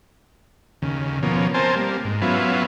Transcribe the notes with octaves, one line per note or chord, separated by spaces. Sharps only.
D#2 C#3
B2 F3 A#3 C#4
C4 A#4 C5 G#5 A5
G3 A#3
G#2
F#3 B3 C#4 E4 F4